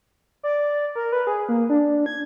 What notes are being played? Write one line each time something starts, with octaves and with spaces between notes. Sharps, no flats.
D5
A#4
B4
G#4
A#3
D4
G#6